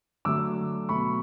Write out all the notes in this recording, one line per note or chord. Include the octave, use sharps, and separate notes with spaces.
D3 F#3 A3 D6 E6
B2 F#3 A3 B5 C#6